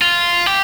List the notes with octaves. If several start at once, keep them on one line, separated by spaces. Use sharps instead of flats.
F4
G4